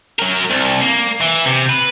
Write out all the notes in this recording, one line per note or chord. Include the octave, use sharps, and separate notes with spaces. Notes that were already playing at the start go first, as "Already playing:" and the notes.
F#3 A#4
C2
A#3
E3
C3
B4